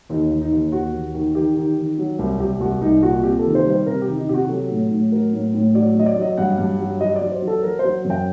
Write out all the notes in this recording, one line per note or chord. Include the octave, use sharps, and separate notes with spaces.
D#2 D#4
D#2
D#4
D#2
D#2 F#4
D#2
D#3
D#3 G4
D#3
D#3
F#3
C2 G4
C2 G4
C2 F#4
C2 D#4
A#2 F#4
C3 G4
A4
D#3
C5
G3 C5
C3 A#4
G4
D#3
D#4
C3 G4
F#4
F#3 A4
A2
A2
F#3 A#4
A2
A2
F#3 D5
F#3 D#5
D5
F#3
D#5
G2 F#5
G2
F#3
F#3 D#5
D5
F#3
C5
F#3
A4
F#3 A#4
C5
F#3
F#2
G5